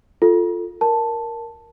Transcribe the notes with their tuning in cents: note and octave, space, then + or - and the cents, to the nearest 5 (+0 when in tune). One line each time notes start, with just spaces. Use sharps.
F4 +0 A4 +0
A#4 +0 A5 +0